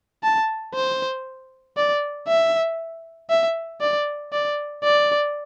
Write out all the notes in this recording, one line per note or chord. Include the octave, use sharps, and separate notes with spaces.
A5
C5
D5
E5
E5
D5
D5
D5